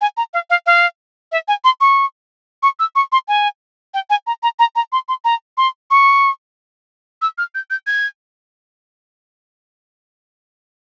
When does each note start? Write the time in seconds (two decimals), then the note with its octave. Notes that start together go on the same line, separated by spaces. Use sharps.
0.01 G#5
0.17 A#5
0.34 F5
0.50 F5
0.66 F5
1.32 E5
1.48 G#5
1.64 C6
1.81 C#6
2.63 C#6
2.79 E6
2.95 C#6
3.12 C6
3.28 G#5
3.94 G5
4.10 G#5
4.27 A#5
4.43 A#5
4.59 A#5
4.76 A#5
4.92 C6
5.08 C6
5.25 A#5
5.57 C6
5.91 C#6
7.22 E6
7.38 F6
7.55 G6
7.70 G6
7.87 G#6